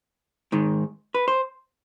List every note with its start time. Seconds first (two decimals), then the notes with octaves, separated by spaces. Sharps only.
0.52 G#2 D#3
1.14 B4
1.28 C5